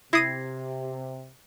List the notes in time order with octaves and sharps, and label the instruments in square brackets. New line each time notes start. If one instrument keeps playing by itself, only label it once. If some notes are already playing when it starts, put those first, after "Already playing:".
[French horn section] C3 [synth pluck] E4 D#6 D#7 [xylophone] G#6 A#6 C7